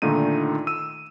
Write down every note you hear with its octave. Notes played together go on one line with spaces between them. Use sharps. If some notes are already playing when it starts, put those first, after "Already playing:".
A#2 D3 D#3 A3 D#4 D#7
E6 D#7